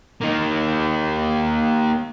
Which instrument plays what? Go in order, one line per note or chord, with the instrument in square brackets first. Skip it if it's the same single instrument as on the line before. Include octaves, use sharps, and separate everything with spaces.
[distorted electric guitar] A#3 D#4